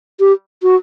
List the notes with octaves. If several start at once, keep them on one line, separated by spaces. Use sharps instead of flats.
G4
F#4